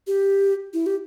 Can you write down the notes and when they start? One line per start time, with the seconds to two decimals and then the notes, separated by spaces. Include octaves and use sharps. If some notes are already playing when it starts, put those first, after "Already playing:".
0.07 G4
0.73 E4
0.86 G4